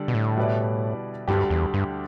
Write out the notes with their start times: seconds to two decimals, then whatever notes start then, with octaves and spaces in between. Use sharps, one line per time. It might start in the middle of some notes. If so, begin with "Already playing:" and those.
Already playing: D3 G3 D4 A4 D5
0.08 B2
0.14 A2
0.37 B2 G3 E4 B4 D5
1.28 D2 G2 D3 G3 D4 G4
1.50 E2
1.74 G2